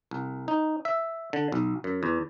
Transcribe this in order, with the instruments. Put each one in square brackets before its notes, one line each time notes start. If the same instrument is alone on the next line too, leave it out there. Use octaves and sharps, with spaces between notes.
[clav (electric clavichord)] C2
D#4
E5
D3
B1
F#2
E2